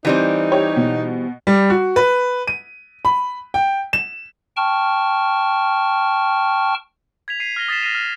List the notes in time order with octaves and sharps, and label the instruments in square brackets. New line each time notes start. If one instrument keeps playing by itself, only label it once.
[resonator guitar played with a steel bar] E3 G3 C4 [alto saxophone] D#4
[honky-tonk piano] G4 C#5
B2
[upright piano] G3
F#4
B4
D#7
B5
G5
E7
[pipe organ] G5 A5 C#6 F6
[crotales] G#6 B6 F7
B6 C7 D#7
F6 A#6 G7
D#6 A6 B6 C7 E7
F6 A#6 C7 D#7 F7
F6